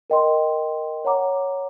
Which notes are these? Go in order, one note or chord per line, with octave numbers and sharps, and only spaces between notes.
A#4 D#5 G5 C6
C#5 F#5 A#5 D6